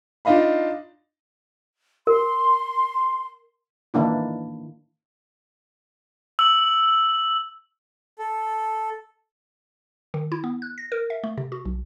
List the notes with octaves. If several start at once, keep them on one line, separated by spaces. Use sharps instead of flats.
D4 D#4 F4 D#5 F5 B5
A#4 C6
D#3 E3 A#3 D4 E4
E6 F#7
A4
D#3
E4
B3
F#6
A#6
A#4
E5
A3
C3
F#4
B1